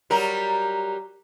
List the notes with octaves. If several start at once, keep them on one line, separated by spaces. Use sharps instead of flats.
F#3 G3 A#4